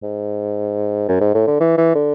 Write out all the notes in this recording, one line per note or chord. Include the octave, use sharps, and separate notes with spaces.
G#2
F#2
G#2
A2
D3
E3
E3
D3